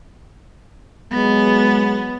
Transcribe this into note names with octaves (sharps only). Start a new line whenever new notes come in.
F#3 G#3 B3